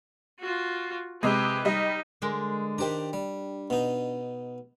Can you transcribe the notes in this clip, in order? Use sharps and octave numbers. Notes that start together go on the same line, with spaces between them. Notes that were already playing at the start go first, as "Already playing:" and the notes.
F4 F#4
C3 G#3 G4 B4
G3 D#4 D#5
D3 G#3 A#4
D#3 D4 G4 C5 A#5
G3
B2 D#4